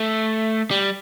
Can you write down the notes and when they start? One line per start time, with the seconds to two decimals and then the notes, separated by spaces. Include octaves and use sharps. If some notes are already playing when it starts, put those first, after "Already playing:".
Already playing: A3
0.71 G3